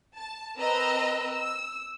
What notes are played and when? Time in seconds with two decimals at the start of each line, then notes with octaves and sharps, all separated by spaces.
0.15 A5
0.58 C4 A#4 B4 D#5 A#5 E6
1.32 E6